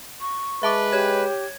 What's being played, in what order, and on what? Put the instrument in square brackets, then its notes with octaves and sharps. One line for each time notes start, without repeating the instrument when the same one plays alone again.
[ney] C#6
[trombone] G#3 [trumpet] B4 [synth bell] E5 A5 D6
[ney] G4 [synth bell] C#5 G#6